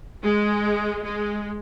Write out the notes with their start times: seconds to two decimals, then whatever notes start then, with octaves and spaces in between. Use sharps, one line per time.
0.23 G#3
1.03 G#3